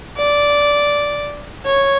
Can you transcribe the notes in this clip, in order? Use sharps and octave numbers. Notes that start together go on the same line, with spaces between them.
D5
C#5